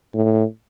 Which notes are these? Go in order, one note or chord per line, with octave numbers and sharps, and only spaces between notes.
A2